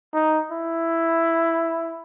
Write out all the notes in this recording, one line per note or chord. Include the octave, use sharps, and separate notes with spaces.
D#4
E4